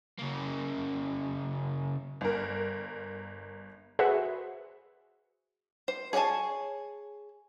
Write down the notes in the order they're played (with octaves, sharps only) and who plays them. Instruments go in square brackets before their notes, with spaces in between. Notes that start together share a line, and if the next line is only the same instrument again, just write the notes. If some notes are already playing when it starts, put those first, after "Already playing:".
[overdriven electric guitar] C#3 A#3
[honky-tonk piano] G1 A#4
[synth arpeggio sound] F#4 G#4 B4 C5 E5 F#5
[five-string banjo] C5
G#4 C#5 F#5 G#5 A5